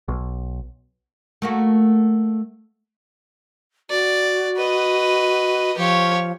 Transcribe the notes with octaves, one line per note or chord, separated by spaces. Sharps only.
B1
A3 A#3 F#4
F#4 D5
B4 D#5
F3 G4 C#5